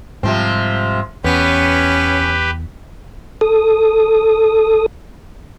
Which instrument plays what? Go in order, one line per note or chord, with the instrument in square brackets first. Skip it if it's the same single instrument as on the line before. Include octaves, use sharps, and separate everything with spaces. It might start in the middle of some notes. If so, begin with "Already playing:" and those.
[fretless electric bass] G#2 G3 [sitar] C3 F3 C4
[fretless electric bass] E2 [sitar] B3 [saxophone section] C#4 [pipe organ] G4 B4
[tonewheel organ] A4 D#6